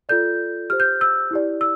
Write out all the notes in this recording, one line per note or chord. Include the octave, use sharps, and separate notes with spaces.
F4 A4 D5 G6
G4 C5 F6
G6
E6
E4 G4 D5
E6